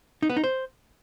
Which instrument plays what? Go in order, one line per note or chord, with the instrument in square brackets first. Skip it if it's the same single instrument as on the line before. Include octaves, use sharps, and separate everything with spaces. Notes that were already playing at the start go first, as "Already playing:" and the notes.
[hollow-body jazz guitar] D#4
B3
D#4
C5